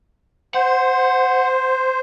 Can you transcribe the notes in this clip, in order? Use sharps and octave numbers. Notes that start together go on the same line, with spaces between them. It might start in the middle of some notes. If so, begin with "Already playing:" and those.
C5 F#5